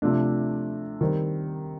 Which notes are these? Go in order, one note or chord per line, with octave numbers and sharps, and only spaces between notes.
C3 F3 A3 D4
D#3 G3 C4